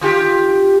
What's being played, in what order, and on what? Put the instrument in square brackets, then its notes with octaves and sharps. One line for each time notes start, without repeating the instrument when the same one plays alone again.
[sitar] D3 F4 G4